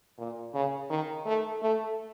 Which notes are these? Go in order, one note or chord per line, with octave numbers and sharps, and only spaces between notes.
A#2
C#3
D#3
A3
A3